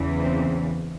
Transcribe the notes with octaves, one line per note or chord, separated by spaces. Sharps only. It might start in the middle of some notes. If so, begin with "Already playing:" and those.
Already playing: E2 C#3 E3
C4